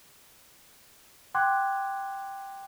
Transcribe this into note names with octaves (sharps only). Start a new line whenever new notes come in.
F#5 G5 C6 D6 F#6 G#6